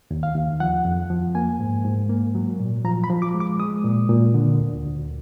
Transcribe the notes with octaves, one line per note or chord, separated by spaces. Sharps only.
D#2
F5
D#2
F3 F#5
F2
F3
A#3 G#5
G#2
G#2
A#3
F#3
A#2
F3 A#5
B5
F3
D6
G#3
D6
G#3 D#6
A#2
A#2
D3
D2
D2